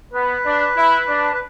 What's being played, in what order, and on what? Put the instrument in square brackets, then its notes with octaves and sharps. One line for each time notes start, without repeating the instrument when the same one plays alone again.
[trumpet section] B3 [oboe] B4
[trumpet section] D4
E4
D4
[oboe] B4